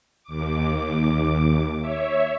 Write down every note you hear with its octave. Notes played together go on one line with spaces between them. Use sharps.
D#2 D6
C#5 E5